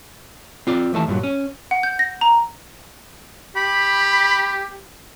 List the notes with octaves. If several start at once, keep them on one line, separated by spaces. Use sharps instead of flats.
C4 F4 D5
D#2 E3 A3 A5
G2 A#2 E3 F#3
C#4
F#5
G6
A#6
A#5
G4 B5